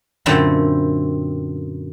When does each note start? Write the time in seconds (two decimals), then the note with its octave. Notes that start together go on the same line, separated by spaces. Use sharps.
0.26 F#2 A#2 D3 A3 C4 B5